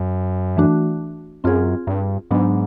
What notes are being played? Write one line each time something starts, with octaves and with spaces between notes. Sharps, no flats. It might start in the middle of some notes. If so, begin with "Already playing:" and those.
Already playing: F#2
E3 A3 D4 F#4
F#2 C4 F4 G#4
G2
G#2 F#3 B3 D4